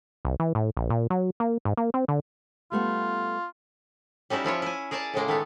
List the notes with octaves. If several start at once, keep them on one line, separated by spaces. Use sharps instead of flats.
C2
E3
A2
A#1
A#2
F#3
A#3
G#2
A#3
C4
D3
G3 A3 B3 F4
G3 C#4 D#4 E4 F#4
F3 E4 F4 C#5
E4 G#5
G#4 A#4 D5 G#5 A5
A2 C#3 G#3 A#3
D#3 A3 B3